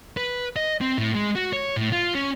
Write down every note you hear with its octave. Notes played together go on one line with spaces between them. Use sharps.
B4
D#5
C4
A2
G#3
F#4
C#5
A2
F4
C#4